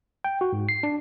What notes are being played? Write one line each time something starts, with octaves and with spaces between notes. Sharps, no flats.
G5
F#4
G#2
C7
D4